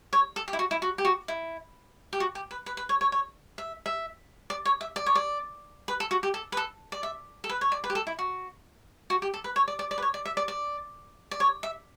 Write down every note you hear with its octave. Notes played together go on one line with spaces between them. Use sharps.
C#5
A4
G4
E4
F#4
E4
F#4
G4
F#4
E4
G4
F#4
G4
B4
B4
B4
C#5
C#5
C#5
E5
E5
D5
C#5
E5
D5
C#5
D5
B4
A4
F#4
G4
A4
B4
A4
D5
E5
A4
B4
C#5
D5
B4
G4
A4
E4
F#4
F#4
G4
A4
B4
C#5
D5
D5
D5
B4
C#5
D5
E5
D5
D5
D5
C#5
E5